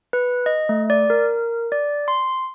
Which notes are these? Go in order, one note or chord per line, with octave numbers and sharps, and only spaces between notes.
B4
D#5
A3
D5
A#4
D5
C6